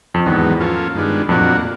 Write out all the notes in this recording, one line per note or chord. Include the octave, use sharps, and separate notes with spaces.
F2
E2 G#2 D#3 F#3 B3
F3 A#3 C#4 F4 A4
G2 D#3 G#3 B3 D4
F2 A#2 F#3 A#3 D4 F#4
F2